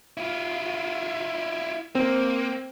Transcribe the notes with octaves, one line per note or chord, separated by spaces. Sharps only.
E4 F4
A#3 C4